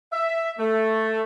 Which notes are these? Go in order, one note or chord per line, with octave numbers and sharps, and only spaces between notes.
E5
A3